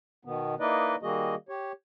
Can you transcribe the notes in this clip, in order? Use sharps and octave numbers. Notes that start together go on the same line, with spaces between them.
B2 D#3 B3
A#3 D#4 E4 B4 D5 D#5
D#3 G3 A#3 F#4 G#4 D#5
G4 C#5